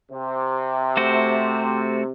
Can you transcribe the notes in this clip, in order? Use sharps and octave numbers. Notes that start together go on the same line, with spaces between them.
C3
A3 F#4 C5